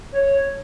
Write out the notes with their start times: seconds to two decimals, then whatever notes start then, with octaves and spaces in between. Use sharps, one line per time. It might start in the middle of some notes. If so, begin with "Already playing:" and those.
0.12 C#5